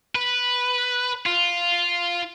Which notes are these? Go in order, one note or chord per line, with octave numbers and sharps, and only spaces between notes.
B4
F4